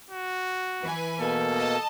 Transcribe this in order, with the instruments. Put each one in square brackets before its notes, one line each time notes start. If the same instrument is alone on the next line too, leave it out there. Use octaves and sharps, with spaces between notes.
[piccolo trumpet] F#4
[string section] E3 B4 G#5
[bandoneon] B2 A#3 [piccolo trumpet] A4
[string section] D#5 A5